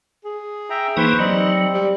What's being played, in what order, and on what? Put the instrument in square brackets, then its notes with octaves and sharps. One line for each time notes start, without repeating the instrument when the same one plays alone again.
[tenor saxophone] G#4
[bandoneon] E5 G5 A#5
[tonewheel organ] E3 A#3 D#4 [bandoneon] B4 C5 C#6
[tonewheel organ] F#3 [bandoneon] G3 C4 [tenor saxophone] D#4
[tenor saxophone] G3